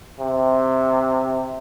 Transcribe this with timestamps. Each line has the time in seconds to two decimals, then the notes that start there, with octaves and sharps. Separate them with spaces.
0.20 C3